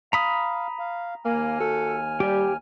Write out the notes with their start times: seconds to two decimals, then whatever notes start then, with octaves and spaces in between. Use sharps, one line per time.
0.13 F5 A#5 B5 D#6
0.79 F5
1.26 D#2 A#3 G#5 F6
1.60 F#4 A4
2.20 G3 G4